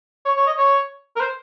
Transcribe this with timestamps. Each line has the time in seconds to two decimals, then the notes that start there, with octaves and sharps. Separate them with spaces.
0.26 C#5
0.37 C#5
0.46 D#5
0.57 C#5
1.16 A#4
1.20 C5